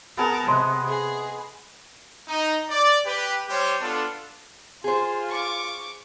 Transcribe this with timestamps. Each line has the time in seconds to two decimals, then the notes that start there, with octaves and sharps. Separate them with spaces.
0.17 B3 G#4 A#4 F#5 A5
0.48 C3 D#5 C6 F#6
0.87 G#4
2.28 D#4
2.70 D5
3.05 G4 B4
3.49 G3 G4 C5 C#5
3.80 B3 D4 F4 A4
4.84 F4 G#4 C5
5.29 C#6 D6